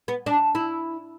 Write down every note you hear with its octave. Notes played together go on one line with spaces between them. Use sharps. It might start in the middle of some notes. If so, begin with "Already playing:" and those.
B3
D4
E4